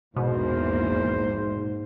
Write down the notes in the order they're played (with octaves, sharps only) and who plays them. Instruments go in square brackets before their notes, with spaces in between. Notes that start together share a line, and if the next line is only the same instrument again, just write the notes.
[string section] A#1 E2 A#3 [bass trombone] G#2 [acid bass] B2 [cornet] C5